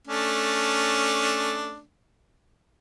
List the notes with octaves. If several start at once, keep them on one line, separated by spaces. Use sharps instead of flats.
A3 C#4 D4